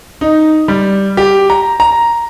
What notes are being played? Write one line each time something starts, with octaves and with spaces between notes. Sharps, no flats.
D#4
G3
G4
A#5
A#5